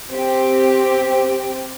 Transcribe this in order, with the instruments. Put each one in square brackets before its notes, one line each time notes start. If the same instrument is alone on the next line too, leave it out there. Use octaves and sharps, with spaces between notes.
[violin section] C4 G4